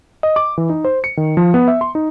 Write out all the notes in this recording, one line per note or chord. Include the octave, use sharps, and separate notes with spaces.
D#5
D6
E3
D#4
C5
C#7
D#3
F3
B3
E5
C6
D#4